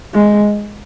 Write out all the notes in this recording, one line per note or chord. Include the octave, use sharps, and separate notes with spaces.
G#3